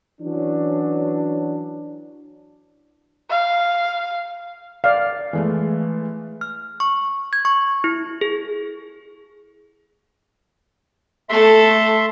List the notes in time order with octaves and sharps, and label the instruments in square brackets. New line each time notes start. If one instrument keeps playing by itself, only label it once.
[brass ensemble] E3 F#3 C#4 D4
[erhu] F5
[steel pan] D5 F5
[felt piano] E3 G#3 A3
[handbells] F6
C#6
G#6
C#6
E4
G#4
[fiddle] A3 A4 [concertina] E5 C6